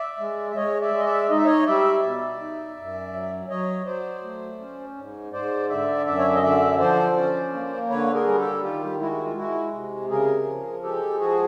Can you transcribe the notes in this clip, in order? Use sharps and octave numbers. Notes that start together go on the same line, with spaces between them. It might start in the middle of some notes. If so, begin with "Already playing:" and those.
Already playing: D5 E5
G#3
E5
G#3 C#5 D#5
D5 E5
G#3
D#5
D5 E5
D#4 D#5
E5
C#5 D#5
G3 D5 E5
B2
D#4
F#2
F#3
F#3 C#5 D#5
F#3 C5 D5
A3
C#4
G#2
G#2 C5 D5
D3 D5 E5
F#2 D5 E5
C#5
D5
D#5
D3 D5 E5
F3 C5 D5
C#4
A#3
D3 B4 C#5
G#4 A#4
G3
G4 A4
D#3 F4 G4
G#3 E4 F#4
E4
F4
G#3 E4 F#4
C3
C#3 G#4 A#4
F3
G#3 G4 A4
F3 F#4 G#4